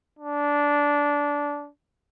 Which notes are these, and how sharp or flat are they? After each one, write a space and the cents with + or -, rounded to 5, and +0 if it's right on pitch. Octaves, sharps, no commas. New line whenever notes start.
D4 -15